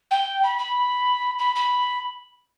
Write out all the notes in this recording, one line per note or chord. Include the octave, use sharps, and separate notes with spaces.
G5
B5
B5
B5
B5